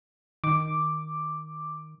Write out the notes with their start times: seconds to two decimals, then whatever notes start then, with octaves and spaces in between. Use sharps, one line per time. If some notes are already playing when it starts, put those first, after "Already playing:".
0.44 D#3 D6